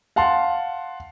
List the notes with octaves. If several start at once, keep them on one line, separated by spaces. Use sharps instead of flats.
F5 F#5 A5 C6